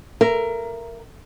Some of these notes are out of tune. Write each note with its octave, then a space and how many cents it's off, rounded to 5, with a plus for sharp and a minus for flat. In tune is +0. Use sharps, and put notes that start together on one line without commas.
A#4 +0 E5 +30